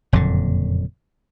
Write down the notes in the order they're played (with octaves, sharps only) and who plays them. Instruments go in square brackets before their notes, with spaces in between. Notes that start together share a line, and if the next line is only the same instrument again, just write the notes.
[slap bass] F#1 F2 A#2 D3